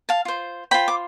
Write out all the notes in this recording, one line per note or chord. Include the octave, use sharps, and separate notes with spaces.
F5 A5
F4 C5
F4 C5 G5 B5
D6